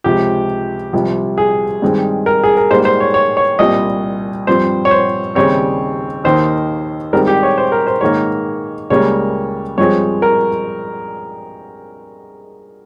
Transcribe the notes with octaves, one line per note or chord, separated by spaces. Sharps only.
C#2 C3 F3 G4
C2 C3 F3
G#4
G2 D#3 G#3 C4
A#4
G#4
A#4
G#2 G3 A#3 C5
C5
C#5
C#5
C#5
C2 A#2 G3 C4 D#5
G2 F3 C4 C5
C#5
C5
D#2 C#3 G3 C4 C#5
D#2 D#3 A#3 C5
G#2 D#3 G3 C4 A#4
G4
C#5
C5
A#4
C5
G#2 D#3 A#3 C#5
C#2 C#3 G3 A#3 C#5
G2 F3 G#3 C4 C#5
A#4